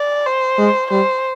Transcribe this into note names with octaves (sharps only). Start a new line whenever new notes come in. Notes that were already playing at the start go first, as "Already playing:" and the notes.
Already playing: D5
C5
G#3
G3 C5